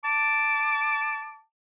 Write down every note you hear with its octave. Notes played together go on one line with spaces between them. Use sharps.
A5 D6